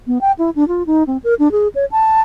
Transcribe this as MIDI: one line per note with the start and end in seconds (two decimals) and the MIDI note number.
0.07 0.18 59
0.21 0.32 79
0.39 0.50 64
0.56 0.67 62
0.68 0.83 65
0.87 1.03 63
1.07 1.17 60
1.24 1.34 70
1.39 1.51 62
1.52 1.68 68
1.75 1.85 73
1.92 2.21 81